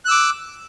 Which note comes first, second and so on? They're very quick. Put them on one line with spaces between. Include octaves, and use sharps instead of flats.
F#6 E6 D6